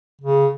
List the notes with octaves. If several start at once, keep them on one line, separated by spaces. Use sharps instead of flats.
C#3